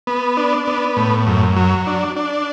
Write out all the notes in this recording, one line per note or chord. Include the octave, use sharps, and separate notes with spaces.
B3
D4
B3
A2
F#2
F#3
D4
D4